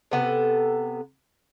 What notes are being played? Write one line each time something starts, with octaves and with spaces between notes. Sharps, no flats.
C3 B3 A4